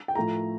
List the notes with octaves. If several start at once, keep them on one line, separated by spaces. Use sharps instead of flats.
G5
A2 F3 A3 A#5